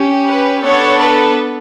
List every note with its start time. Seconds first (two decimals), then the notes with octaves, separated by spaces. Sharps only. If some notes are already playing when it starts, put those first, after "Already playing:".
Already playing: C#4 G4
0.27 B4
0.63 B3 D4 A4 C#5
0.99 B4